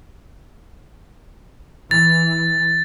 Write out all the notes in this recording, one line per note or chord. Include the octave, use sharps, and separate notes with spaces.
E3 A6